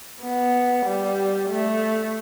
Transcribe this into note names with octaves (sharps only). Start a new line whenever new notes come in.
B3
G3
A3